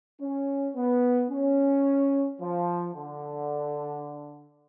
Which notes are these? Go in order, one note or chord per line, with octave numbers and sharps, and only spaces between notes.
C#4
B3
C#4
F3
D3